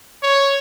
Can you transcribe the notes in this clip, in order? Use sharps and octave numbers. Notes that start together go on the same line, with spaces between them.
C#5